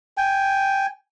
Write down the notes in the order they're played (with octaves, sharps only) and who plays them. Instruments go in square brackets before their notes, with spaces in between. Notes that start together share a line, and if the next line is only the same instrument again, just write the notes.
[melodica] G5 G#5